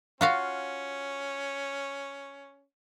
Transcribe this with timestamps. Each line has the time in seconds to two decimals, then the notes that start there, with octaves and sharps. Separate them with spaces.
0.21 C#4 F4 F#4 F5